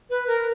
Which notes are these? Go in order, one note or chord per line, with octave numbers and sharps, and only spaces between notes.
B4
A#4